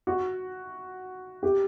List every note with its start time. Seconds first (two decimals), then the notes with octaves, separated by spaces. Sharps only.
0.07 F#4
1.43 G4